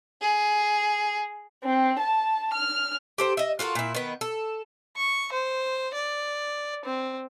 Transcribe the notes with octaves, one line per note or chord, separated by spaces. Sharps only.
G#4
C4
A5
F6
G4 A4 C5
D#5 E5
F4 F#4 A4 A#4
A#2 E4
D#3 B3
A4
C#6
C5
D5
C4